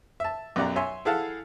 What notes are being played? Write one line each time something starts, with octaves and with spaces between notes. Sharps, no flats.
E5 A5
B1 F#2 G4 D5 F#5 A#5
C#5 E5 G#5 C6
E4 G#4 A4 F5 F#5 A5